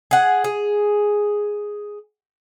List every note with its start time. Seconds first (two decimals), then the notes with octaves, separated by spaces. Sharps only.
0.11 G#4 F#5
0.44 G#4